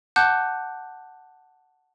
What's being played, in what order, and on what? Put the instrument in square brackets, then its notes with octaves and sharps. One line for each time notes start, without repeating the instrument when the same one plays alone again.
[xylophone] F#5 A5 D6 F#6 G6